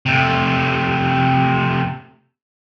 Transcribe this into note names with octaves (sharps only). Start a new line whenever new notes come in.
C3 A3